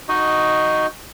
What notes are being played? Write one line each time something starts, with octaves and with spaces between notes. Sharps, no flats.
D#4 F#4 D#5